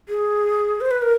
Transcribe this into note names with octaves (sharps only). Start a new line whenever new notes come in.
G#4
C5
B4
A#4